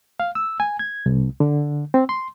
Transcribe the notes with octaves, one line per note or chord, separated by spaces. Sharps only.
F5
E6
G#5
G#6
C2
D3
C4
C6